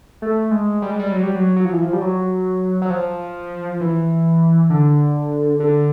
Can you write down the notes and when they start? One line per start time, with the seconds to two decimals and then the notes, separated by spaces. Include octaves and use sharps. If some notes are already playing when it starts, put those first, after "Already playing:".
0.22 A3
0.51 G#3
0.82 G3
0.90 G#3
0.99 G3
1.12 F#3
1.23 G3
1.35 F#3
1.56 F#3
1.65 F3
1.73 E3
1.82 F3
1.93 G3
2.01 F#3
2.82 F#3
2.90 F3
3.81 E3
4.70 D3
5.60 D3